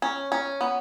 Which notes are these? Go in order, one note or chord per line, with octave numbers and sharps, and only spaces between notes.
C#4
C#4
B3